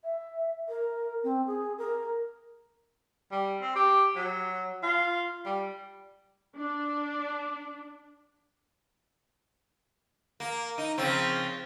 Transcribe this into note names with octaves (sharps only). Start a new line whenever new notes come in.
E5
A#4
C4
G#4
A#4
G3
C4
G4
F#3
F4
G3
D4
A#3
D#4
C#3 F3 C4